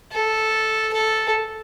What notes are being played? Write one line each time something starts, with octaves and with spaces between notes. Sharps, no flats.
A4
A4